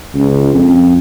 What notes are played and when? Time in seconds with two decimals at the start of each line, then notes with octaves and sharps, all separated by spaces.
0.15 C#2
0.54 F2